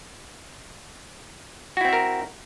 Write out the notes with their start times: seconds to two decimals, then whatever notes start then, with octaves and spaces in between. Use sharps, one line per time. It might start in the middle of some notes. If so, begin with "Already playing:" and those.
1.77 F#4
1.81 E4
1.85 C4
1.89 E5
1.93 A#4